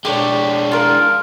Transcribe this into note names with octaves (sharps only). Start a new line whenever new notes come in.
G#3 D4 G4 C5 C#5
F4 A#4